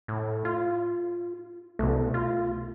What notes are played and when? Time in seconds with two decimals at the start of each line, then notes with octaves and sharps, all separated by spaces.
0.08 A2
0.45 F4
1.79 C2 B2 A3
2.14 F4